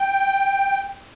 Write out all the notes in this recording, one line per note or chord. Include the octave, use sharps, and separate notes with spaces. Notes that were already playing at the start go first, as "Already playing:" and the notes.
Already playing: G5